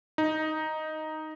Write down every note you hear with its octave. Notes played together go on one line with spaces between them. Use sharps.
D#4